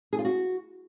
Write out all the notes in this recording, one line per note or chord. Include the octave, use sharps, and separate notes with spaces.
G#4
F4
F#4